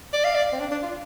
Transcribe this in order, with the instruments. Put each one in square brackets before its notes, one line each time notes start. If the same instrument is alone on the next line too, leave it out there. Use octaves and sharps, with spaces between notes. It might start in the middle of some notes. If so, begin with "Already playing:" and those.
[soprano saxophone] D5
F5
D5
C4
D4
D4
F4